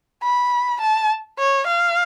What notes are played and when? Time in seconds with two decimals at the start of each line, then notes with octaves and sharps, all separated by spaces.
0.23 B5
0.81 A5
1.39 C#5
1.67 F5